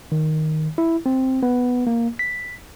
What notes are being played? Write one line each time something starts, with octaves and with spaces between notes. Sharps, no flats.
D#3
E4
C4
B3
A#3
B6